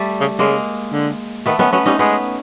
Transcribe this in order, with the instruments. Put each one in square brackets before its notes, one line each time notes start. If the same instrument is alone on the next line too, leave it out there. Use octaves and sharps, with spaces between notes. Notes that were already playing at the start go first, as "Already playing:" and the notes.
Already playing: [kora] G3 A3
[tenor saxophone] C#3
[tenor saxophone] C#3 [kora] G#3 A#3
[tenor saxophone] D3
[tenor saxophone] D#3 [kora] A3 B3
[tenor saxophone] D#3 [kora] B3 C#4
[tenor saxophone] F#3 [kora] B3 C#4
[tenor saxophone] G3 [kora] C#4 D#4
[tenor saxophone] G#3 [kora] B3 C#4